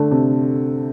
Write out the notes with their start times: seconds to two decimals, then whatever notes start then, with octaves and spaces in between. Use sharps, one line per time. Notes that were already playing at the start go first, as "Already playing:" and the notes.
Already playing: D3 A3
0.11 C3